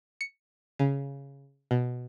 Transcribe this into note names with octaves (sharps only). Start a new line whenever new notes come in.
C#7
C#3
B2